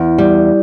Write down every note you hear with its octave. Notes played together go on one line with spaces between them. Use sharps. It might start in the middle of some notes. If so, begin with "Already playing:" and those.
Already playing: E2
G3